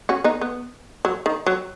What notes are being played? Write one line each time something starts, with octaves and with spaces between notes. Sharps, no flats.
C#4 F#4
B3 D#4
B3
F#3
D#3
F#3